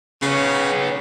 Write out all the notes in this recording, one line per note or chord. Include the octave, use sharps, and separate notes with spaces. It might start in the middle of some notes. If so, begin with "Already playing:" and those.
C#3 B3 C#5